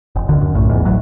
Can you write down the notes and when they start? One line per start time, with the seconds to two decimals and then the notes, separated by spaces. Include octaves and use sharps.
0.16 F1
0.28 D2 D3 D#3
0.41 F#2
0.54 A#1 A2
0.69 D#1 E2 G#2
0.85 D#1 A1 A2 F#3